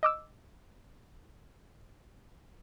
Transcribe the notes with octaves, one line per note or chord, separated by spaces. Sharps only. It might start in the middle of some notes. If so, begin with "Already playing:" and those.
D#5 D6 E6